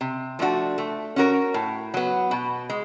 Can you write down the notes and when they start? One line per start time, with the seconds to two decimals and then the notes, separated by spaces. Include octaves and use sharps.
0.01 C3
0.39 F3 A3 D4 F#4
0.78 A3
1.16 C#4 F#4 A#4 C#5
1.54 A2
1.94 F#3 B3
2.31 B2
2.69 G#3